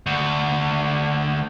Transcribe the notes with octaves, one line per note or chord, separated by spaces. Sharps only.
D2